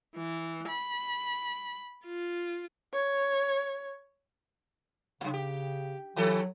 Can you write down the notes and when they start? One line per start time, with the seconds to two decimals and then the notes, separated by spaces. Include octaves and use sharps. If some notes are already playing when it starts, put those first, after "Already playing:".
0.16 E3
0.68 B5
2.06 F4
2.93 C#5
5.21 F#2 A2 C#3
5.33 G4
6.16 D#3 F#3 G4 A4